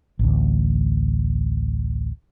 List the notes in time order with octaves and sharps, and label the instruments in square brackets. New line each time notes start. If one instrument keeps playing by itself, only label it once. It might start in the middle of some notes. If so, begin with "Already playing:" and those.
[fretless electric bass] A1 D2